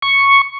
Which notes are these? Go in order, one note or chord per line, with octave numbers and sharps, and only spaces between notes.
C#6